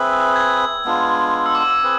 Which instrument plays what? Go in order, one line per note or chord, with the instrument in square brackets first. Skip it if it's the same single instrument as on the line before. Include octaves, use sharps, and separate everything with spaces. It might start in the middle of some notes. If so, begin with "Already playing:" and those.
Already playing: [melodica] C4 G#4 B4 E5 [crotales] E6
[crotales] G#6
[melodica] G#3 B3 D4 F4
[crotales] E6
D6
E6
E6
[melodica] C4 G#4 B4